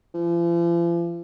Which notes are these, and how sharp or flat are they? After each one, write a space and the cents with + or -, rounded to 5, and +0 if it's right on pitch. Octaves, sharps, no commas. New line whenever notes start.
F3 -45